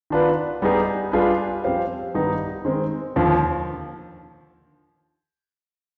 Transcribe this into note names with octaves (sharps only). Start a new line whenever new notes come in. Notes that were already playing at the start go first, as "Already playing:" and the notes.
D#3 B3 D4 F4 B4
G3 B3 D#4 G#4
G3 D4 F4 G#4 B4
F3 C4 G4 C5 F5
G2 D#3 G3 B3 D#4
D#3 G#3 C4
D#2 D3 F3